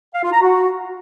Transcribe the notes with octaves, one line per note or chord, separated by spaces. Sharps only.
F5
F4
A#5
F#4